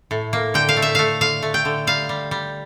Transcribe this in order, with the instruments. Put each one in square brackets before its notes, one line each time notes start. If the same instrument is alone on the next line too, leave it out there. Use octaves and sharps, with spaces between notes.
[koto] A2
A#3
D3 G5
F5
A3
E5
A3 F5
D3 F5
A3
G5
D3
G3 F5
G3
G3